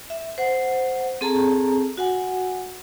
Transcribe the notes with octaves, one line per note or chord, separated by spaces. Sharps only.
E5
C5 F#5
C4 G#4 A4 A5 A#5
F#4 F#5 G#5